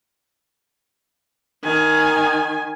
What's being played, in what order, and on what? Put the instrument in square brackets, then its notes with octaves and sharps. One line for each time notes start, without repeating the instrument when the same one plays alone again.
[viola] D#3 G#5